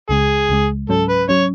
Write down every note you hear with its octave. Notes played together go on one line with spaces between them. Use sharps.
C#2 C#3 G#3 G#4
C#2 C#3 G#3
G#2 F#3 C#4 A4
B4
F#3 C#4 C#5